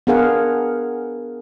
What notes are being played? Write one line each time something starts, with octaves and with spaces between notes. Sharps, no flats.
B3 D4 G#4 A#4 F5 F#5